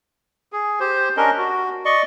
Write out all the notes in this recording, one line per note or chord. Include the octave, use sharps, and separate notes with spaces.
G#4
G4 C5
C#4 D4 A#4 D#5
F#4
D5 D#5 C#6